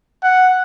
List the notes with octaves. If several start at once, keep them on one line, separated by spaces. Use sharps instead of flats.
F#5